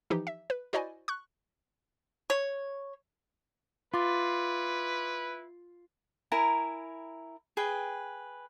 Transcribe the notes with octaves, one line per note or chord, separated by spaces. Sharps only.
E3 F3 D#4 G4
E5
B4
E4 F#4 C5 D5 D#5 G#5
C#6 F#6
C#5
E4 F4 B4 C6 D6 A6
E4 A#4 G#5 A#5
G#4 B4 G5